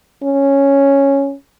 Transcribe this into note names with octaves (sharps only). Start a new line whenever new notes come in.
C#4